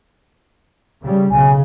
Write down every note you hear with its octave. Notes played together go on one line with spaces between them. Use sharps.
C#3 G3
B1 C#3 G#5